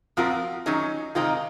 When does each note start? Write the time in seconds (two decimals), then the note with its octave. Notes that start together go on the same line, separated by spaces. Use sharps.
0.17 F3 C4 F4 F#4 A#4
0.66 D#3 F#3 C#4 D#4 G#4
1.15 C3 D#3 G#3 C4 D#4 F4